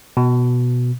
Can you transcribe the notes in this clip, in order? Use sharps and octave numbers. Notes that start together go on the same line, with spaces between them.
B2